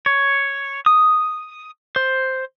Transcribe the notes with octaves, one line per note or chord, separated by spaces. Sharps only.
C#5
D#6
C5